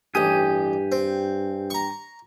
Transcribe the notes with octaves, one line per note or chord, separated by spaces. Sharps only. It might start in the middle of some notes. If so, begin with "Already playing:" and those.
A1 G2 G4 G#5 D#6
C4
A#5 C#6